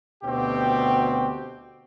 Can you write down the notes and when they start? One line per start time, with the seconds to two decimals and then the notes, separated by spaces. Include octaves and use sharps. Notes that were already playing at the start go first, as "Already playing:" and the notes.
0.23 D2 B2 C4 F#4 G4